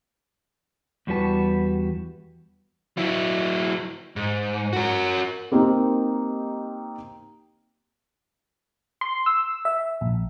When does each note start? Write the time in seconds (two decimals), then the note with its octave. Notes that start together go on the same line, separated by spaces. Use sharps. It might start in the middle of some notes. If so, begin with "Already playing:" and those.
1.07 E2 G3 F#4 B4 A5
2.97 F#3 E4
4.16 G#2
4.73 F#4 A#4
5.52 A#3 C4 D#4 G4
9.01 C6
9.26 E6
9.65 E5
10.01 A#1